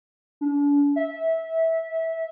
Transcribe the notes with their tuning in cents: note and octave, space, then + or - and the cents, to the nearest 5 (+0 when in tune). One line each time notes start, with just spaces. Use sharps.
D4 -40
E5 -20